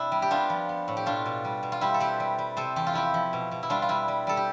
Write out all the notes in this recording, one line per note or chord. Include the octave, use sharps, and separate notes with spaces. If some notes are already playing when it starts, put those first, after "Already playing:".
Already playing: C3 D4 E4
G3
G4
B3 D4 F4
F3
B3
A2
G4
B2 D4 F4
B2
G3
B2
F4
G3 E4 G4
A4
C4 G4 B4
G3
G3
C3 A4 C5
E2 G4
F4
F3 E4 G4
F3
B2
B2
E4
G3 D4 F4
F4
G3 E4
G3
G3 A4
G4